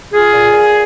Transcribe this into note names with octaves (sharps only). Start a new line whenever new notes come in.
F4 G#4
A#2
A#2